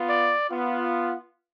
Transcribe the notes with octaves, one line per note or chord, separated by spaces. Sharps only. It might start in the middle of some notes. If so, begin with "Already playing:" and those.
Already playing: B3 F4
D5
B3 F4